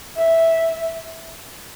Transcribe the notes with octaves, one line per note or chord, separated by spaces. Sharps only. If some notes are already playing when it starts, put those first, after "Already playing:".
E5